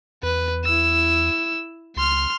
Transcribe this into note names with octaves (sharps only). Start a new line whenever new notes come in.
E2 B4
E4 E6
C#2 C6 F6